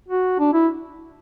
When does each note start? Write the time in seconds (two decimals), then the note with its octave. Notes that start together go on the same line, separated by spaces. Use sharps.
0.08 F#4
0.39 D4
0.54 E4